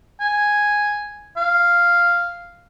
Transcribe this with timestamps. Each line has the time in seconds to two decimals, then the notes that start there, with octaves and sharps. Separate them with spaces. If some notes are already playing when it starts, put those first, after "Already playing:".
0.20 G#5
1.37 F5